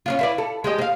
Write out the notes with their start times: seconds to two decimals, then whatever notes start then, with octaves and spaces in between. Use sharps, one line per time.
0.06 C#4 D4 F4
0.19 E4 B4 D5
0.38 A4
0.64 G#3 G4 D#5
0.79 C4 F5